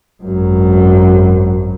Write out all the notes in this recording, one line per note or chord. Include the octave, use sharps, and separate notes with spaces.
G#1 F#2